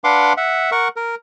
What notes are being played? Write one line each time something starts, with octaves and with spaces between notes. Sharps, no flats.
D4 B4 F5 F#5 C6 D6
E5 F#5
A#4 F#5 C#6
A#4